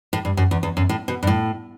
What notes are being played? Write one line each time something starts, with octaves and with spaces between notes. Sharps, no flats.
A2
G2
F#2
E2
E2
F#2
A2
B2
G2
A2